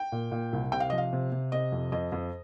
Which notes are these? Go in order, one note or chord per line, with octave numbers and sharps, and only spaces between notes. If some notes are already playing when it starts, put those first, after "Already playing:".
Already playing: G5
A#2
A#2
C2
C3 G5
F5
F3 D#5
F5
C3
C3
C3 D#5
F2
F2 D#5
F2